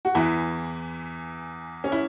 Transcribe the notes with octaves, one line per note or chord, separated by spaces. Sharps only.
F#4
E2 E3 E4
C#4
E4